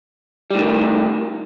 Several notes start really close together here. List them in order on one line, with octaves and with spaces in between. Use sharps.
G3 A2 D#3